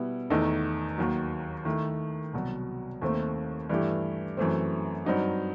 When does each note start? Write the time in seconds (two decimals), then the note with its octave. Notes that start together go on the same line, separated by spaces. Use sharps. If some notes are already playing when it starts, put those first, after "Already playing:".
Already playing: B2 G3 B3 E4
0.30 E2 D#3 A3 D#4 A4
0.98 D#2 D#3 F#3
1.65 D#3 A3 E4
2.34 C2 B2 F#3
3.02 D#2 D#3 A3 C4
3.69 G2 E3 A3 E4 G4
4.37 F#2 E3 A3 C4
5.05 G2 F#3 C4 D#4 F#4